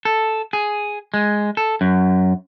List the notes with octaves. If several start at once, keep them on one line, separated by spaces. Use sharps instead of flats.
A4
G#4
G#3
A4
F#2